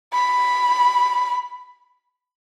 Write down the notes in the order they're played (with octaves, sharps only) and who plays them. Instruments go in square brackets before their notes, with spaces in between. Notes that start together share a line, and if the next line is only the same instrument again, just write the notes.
[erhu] B5